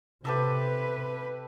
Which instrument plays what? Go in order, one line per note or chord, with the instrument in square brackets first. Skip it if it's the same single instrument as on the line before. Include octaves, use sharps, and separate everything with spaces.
[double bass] C3 [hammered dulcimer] G4 A4 E5 [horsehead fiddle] B4